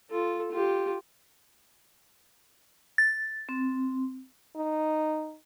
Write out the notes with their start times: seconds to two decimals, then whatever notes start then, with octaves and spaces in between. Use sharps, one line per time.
0.10 F4 A4
0.52 F4 G4
2.98 A6
3.49 C4
4.56 D#4